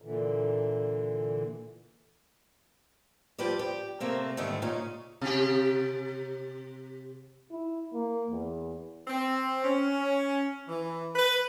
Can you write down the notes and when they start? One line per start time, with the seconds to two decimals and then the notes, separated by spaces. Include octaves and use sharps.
0.02 A#2 D3 E3
3.38 F3 G3 G4 B4 D5
3.59 G4
4.00 C3 A3 A#3 C4
4.37 G#2 D3 D#3 G3 A3
4.62 A#2 C#3 C#4 D#4
5.21 C3 G4
7.51 E4
7.94 A#3
8.31 E2
9.08 C4
9.65 C#4
10.68 E3
11.15 B4